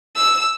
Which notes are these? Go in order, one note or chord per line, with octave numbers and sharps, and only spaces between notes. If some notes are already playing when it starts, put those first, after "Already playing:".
E6